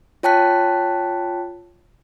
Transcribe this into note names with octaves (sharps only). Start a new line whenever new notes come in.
F4 C#5 G5 A5 F#6 B6